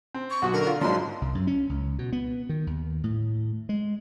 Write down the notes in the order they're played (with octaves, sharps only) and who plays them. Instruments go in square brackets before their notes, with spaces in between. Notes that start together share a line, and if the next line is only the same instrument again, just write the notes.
[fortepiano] C4
[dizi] C#6
[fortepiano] B1 F#4 [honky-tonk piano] F#5
[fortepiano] D3 [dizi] A#4
[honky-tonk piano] F4
[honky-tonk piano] G#2 F#3 [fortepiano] F3 D4 [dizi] C6
[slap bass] C2
F#2
C#4
C#2
B2
B3
D#3
D#2
A2
G#3